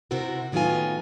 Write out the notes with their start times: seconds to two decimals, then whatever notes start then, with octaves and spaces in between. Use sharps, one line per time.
0.11 C3 C4 E4 F#4 A#4
0.52 A2 D#3 F#3 B3 F4 G#5